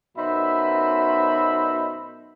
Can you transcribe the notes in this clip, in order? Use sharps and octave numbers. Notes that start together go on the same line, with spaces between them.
F#2 B2 D#4 C5 E5 B5